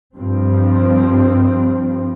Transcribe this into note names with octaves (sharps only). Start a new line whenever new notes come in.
G2 F3 C4